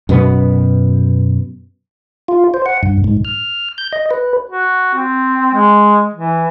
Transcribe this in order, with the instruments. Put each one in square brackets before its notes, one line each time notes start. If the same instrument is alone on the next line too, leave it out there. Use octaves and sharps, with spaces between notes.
[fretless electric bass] F#2 B2 B3
[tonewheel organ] F4
C5
F#5
G2
G#2
F6
G6
D#5
B4
[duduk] F#4
C4
G#3
E3